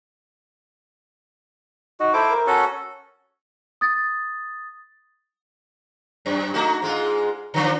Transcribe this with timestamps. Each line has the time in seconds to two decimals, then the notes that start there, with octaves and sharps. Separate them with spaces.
2.00 D#4 F#4
2.13 E4 A4 C5 D6
2.30 A#4
2.47 C#4 F#4 A4
3.81 D#6 A6
6.26 F#2
6.54 A3 D#4 F#4
6.82 G#2 G#3 F4
7.54 D3 F3 D4